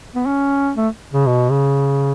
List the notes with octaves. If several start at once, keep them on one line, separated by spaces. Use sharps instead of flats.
B3
C#4
A3
C#3
B2
C#3